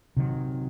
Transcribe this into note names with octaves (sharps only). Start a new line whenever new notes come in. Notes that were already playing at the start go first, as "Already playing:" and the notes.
C3 D#3 F#3